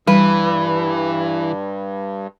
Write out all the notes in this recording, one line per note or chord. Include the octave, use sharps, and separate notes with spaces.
G2 E3 G3 B4